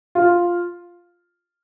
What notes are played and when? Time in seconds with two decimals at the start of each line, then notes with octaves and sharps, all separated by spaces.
0.15 F4